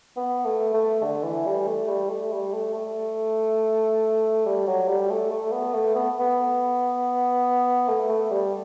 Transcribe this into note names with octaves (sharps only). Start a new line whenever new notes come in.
B3
A3
A3
D3
E3
G3
A3
G3
A3
G3
A3
A3
G3
F#3
G3
A3
A3
B3
A3
B3
B3
A3
A3
G3